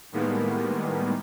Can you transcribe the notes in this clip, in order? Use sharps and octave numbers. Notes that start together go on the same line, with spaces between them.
A2 D#3 G3 G#3 A#3 B3